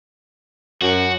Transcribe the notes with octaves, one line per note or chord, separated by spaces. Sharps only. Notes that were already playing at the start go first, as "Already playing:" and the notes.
F#2 F#4